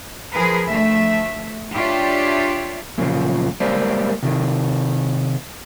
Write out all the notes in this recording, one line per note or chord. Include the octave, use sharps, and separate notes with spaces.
F3 G#4 A#4 B4
D2 F3 A3 E5
D4 F4 G4 C#5 D5 E5
F#2 A#2 C#3 F3
G3 G#3 A#3 C5 D5
C3 D#3